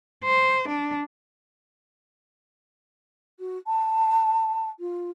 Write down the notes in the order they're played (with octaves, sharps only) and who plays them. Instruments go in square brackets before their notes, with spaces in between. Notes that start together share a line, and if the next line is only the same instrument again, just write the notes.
[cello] C5
D4
[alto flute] F#4
A5
F4